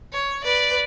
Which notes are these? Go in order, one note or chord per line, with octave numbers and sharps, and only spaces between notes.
C#5
B4 D5